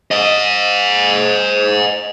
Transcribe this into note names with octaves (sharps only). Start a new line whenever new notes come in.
C5 D#5